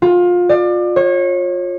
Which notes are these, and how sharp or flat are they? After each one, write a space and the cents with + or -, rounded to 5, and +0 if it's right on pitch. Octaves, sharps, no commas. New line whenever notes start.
F4 +25
D5 +30
C#5 -30